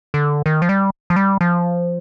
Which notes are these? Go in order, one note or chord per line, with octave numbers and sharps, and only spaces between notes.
D3
D#3
F3
G3
F3
G3
F3